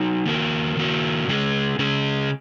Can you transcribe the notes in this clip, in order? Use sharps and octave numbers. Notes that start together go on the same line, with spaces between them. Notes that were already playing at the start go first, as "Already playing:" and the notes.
Already playing: F#3 D#4
D#3 A#3 F#4 A#4
D#3 A#3 F#4 A#4
C#3 G#3 C#4 G#4
C#3 G#3 C#4 G#4